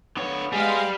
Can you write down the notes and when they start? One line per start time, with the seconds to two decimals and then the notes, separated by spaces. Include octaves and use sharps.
0.17 D3 B3 C#5
0.53 G3 G#3 G#4 F5